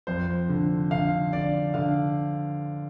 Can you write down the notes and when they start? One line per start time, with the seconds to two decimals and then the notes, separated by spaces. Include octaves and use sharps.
0.07 F2 C5
0.49 D3
0.91 D3 F5
1.33 D3 D5
1.74 D3 F5